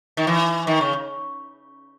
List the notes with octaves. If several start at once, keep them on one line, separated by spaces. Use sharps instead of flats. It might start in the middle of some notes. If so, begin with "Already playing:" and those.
D#3
E3
D#3
C#3